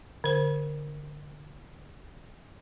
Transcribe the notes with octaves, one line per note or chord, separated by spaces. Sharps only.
D3 C5